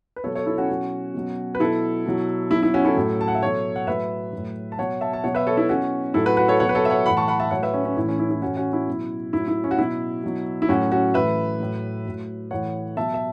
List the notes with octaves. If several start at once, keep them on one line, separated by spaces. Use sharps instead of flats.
B4
B2 F#3 A4 C#5
A4 C#5
E4 A4
C#4 F#4
B2 F#3
B2 F#3
B4
B2 F#3 E4 A4
B2 F#3
B2 F#3 E4
E4
C#4 F#4
E4 A4
A2 F#3
A5
F#5
E5
B2 F#3 A4 C#5
F#5
A2 F#3 B4 E5
A2 F#3
A5
B2 F#3 C#5 F#5
E5 A5
A5
B2 F#3 C#5 F#5
B4 E5
A4 C#5
E4 A4
B2 F#3 C#4 F#4
A2 F#3 E4 A4
F#4 B4
F#4 B4
A4 C#5
B2 F#3 C#5 F#5
B4
A4 C#5
E5
C#5 F#5
A2 E3 F#5 B5
A5 C#6
F#5 B5
E5 A5
A2 F#3 C#5 F#5
B4 E5
C#4
C#4
A2 E3 E4
C#4
E4
E4
A2 E3 C#4 F#4
C#4 F#4
E4
B2 F#3
A2 F#3 E4
E4
C#4
F#4
B2 F#3 E4
B2 F#3
E4
A2 F#3 C#4 F#4
C#4 F#4
A2 E3 B4 E5
A2 F#3
A2 F#3
A2 E3 C#5 F#5
B2 F#3 E5 A5
E5